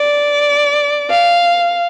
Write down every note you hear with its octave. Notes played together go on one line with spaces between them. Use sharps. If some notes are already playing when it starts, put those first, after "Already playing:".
Already playing: D5
F5